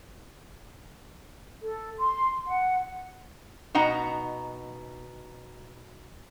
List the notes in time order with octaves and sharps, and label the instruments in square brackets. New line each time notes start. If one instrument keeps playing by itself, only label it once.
[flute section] A4
C6
F#5
[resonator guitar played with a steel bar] B2 D#4 F#5 A#5